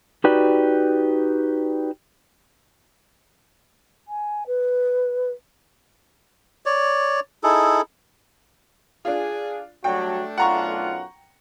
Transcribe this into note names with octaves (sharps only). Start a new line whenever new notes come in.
D#4 F#4 G4 B4 D5
G#5
B4
C#5 D5
D#4 E4 G#4 A4
D4 F4 G#4
F#3 G3 A3 D4 F#4 G5
B1 F#2 F4 F#5 A#5 C#6